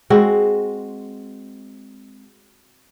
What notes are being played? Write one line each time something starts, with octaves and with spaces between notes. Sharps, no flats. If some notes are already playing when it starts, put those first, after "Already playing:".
G#3 C4 F#4